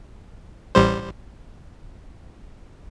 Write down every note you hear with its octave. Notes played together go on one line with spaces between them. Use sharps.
A1 G3 C5